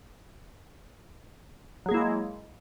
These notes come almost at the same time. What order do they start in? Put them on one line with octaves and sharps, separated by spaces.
F#3 G#4 A#3 E4 G#3